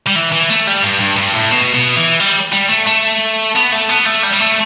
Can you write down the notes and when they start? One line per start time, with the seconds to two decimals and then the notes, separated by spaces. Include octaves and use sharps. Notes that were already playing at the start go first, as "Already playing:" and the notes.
0.07 G3
0.16 E3
0.32 E3
0.50 A3
0.67 G3
0.83 G2
1.00 G2
1.17 G2
1.34 A2
1.52 B2
1.74 B2
1.96 E3
2.20 G3
2.53 G3
2.70 A3
2.87 A3
3.56 B3
3.72 A3
3.90 B3
4.06 A3
4.23 G3
4.33 G3
4.40 A3